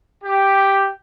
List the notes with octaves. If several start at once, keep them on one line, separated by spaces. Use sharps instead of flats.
G4